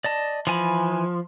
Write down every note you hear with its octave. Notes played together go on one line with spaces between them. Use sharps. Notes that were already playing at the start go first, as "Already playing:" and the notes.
D5 D#5 A5
E3 F3 G#5 B5